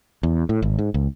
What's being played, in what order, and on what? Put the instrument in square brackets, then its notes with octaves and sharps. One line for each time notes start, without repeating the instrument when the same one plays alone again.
[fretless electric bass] E2
A2
G#1
G#2
C#2